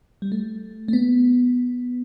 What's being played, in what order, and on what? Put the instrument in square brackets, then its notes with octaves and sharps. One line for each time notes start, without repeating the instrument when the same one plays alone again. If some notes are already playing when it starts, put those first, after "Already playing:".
[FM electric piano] G3
A3
A3
B3